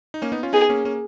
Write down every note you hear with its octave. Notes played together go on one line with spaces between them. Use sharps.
D#4
A#3 C#4
B3 D#4
C#4 F4
B3 D#4 G#4
A#3 C#4
A#3 C#4